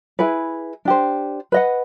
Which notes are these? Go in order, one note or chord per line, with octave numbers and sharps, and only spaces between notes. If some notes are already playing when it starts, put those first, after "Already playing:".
E4 G#4 B4
D4 G4 C5
B4 D#5 F#5